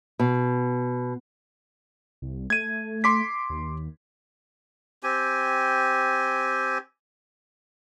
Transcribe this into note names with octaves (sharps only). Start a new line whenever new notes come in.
B2
C2
A3 G#6 D#7
C6 D6 B6
D#2
C4 G4 G#5